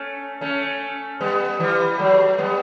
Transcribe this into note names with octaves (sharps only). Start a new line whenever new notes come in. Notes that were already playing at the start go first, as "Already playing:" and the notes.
Already playing: A3 C#4
A3 C#4
G3 B3
E3 G3
F#3 A3
G3 B3